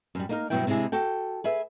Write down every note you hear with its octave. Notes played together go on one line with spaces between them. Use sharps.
F#2 G3
A#3 D#4 A#4
G2 B2 F#3 B3 E4 G5
C3 G#3 D4 E4 G#4
F#4 A4 G5
G#4 B4 E5